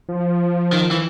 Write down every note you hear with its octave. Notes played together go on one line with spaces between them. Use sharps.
F3
D#3
E3